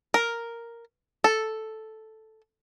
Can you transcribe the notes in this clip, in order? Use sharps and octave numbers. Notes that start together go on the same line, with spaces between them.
A#4
A4